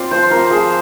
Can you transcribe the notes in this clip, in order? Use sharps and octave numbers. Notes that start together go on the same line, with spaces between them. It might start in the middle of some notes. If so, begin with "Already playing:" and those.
Already playing: C4 F4 D5 F5
F3 C5
C4 F4 A#4
F3 G#4